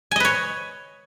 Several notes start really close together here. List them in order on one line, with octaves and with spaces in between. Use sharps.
G#5 D#5 B4 C#5